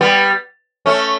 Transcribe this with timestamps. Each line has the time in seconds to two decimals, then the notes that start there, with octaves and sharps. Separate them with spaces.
0.01 G3 B3
0.86 A3 C#4